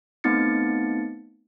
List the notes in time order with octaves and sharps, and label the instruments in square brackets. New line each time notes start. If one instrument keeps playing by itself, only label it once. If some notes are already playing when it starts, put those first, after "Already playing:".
[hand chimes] A3 B3 C4 D#4 A6 C#7